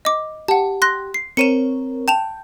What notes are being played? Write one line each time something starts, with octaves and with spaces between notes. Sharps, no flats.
D#5 D6
G4 F#5 A5
C6 F#6 A#6
C7
C4 A#4 C#5 C#7 D#7 E7
G5 A5 E7 F7